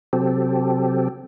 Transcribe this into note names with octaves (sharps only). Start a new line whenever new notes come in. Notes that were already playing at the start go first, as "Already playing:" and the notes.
C3 F#3 C4 G4 A4